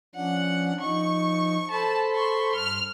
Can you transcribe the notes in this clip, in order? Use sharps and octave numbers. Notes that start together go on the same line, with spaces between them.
F3 C#4 D4 F#5
F3 D#4 C#6
A4 C5 A5 B5
C6 C#6
G2 F6